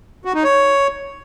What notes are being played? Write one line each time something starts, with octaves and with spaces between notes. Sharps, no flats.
F#4
D#4
C#5